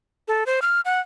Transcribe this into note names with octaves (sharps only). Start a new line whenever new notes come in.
A4
C5
F6
F#5